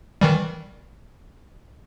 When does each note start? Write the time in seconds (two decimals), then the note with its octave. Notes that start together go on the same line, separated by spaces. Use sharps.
0.21 D#3 E3 G3